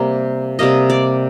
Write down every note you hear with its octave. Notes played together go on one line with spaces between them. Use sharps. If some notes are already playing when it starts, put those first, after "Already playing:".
Already playing: C3 G3 A#3
C3 G3 A#3 D#5
D5